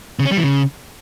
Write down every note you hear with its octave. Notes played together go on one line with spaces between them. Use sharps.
C#3
C#4
G3
E3
C#3